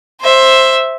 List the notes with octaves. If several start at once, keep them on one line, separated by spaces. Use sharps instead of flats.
C5 E5